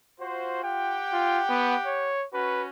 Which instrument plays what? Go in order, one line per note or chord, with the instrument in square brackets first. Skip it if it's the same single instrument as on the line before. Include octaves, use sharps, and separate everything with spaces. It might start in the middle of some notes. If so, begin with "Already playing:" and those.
[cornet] F4 [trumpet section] F#4 C5
[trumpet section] G4 F#5 G5
[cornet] F4
B3
C#5
[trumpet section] C#4 F#4 [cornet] B4